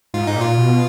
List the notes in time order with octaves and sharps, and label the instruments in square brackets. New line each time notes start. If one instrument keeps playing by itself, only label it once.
[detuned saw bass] G#2 [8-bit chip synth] F4
[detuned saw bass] G#2 [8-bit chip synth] D#4
[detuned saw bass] A#2
[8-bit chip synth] F4
[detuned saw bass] B2